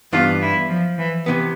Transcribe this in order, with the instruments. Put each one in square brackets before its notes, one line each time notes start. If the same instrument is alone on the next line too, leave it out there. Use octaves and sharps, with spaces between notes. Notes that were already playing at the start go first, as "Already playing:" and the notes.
[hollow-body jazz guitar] G2 E3 B3 D4 [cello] F4
[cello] E4
F3
E3
[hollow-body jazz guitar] C3 E3 B3